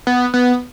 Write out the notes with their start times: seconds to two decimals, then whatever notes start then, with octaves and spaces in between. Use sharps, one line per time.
0.07 B3
0.34 B3